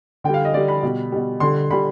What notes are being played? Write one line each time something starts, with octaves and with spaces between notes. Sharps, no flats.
D3 G3 G5
F5
D#5
D3 G3 D5
B5
B2 G3
B2 G3
D3 G3 C6
D3 G3 B5